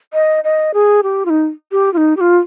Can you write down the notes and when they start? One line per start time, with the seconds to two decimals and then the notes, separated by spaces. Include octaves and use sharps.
0.13 D#5
0.44 D#5
0.74 G#4
1.03 G4
1.26 F4
1.30 D#4
1.72 G4
1.93 F4
1.97 D#4
2.17 G4
2.21 F4